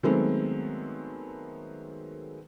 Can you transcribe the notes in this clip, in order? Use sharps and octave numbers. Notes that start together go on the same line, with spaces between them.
D#3 F#3 G#3 A3 B3 C4